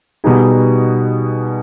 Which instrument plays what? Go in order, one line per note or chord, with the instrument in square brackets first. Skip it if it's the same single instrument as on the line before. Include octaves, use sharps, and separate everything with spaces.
[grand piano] B2 G3 B3 D#4 G#4